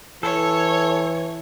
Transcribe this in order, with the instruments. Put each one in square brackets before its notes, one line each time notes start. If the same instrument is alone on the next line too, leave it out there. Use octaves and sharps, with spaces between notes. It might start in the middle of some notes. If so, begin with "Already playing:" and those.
[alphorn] E3 [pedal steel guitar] A4 [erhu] C#5